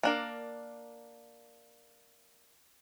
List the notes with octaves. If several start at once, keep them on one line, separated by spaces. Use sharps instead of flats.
A#3 D4 A#4